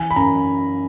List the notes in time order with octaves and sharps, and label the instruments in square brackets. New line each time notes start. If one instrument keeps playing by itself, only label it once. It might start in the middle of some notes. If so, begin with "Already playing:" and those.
Already playing: [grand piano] E3 [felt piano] G#5
[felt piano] B5
[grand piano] F#2 [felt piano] A#5